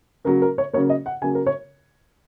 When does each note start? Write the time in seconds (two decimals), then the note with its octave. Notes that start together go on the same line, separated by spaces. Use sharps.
0.25 C#3 F#3 A#3 A#4
0.42 A#4
0.58 C#5
0.73 C#3 F#3 A#3 C#5
0.90 D#5
1.06 F#5
1.22 C#3 F#3 A#3 G#5
1.35 A#4
1.46 C#5